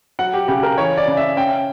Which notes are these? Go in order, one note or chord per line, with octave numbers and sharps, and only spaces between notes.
F#3 F#5
G4
C#3 G4
A#4
E3 C#5
D5
C#3
E5
C#4 G5